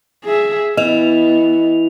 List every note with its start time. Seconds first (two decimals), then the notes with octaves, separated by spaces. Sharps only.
0.25 G#4 E5
0.77 E3 B3 D#5 F7